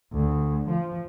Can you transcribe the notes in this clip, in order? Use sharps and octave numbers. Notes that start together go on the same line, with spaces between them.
D2
F3